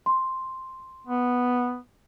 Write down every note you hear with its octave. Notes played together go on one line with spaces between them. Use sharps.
C6
B3